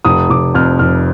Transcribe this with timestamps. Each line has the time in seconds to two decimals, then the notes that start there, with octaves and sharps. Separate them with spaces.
0.05 F1 D#6
0.30 F1 D6
0.54 F2 F6
0.79 F1 F6